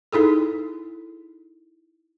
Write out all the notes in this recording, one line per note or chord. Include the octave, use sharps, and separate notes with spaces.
D#4 E4 G#4 A4